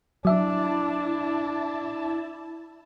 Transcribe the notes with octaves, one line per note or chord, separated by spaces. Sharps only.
F#3 D4 E4 E5 A5